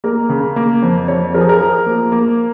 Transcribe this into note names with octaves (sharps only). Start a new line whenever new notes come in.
A#3 A#4
C#3
A#3
F2
F2 C#5
F3 A#4
G#4
A#4
F3
A#3
A#3